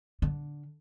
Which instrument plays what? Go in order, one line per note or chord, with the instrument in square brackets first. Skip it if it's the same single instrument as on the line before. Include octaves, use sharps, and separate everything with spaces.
[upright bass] D3